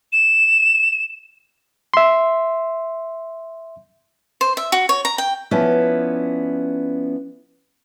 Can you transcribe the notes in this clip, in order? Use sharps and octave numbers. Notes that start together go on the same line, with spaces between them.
E7
E5 C6
C5
E5
F#4
C#5
A#5
G5
F3 B3 C#4 E4 D5